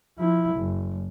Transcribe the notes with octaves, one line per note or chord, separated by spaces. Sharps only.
F3 E4
F#1